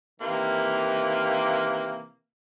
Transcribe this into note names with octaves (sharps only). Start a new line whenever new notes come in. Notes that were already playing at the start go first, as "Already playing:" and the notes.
C3 D#3 E3 A#3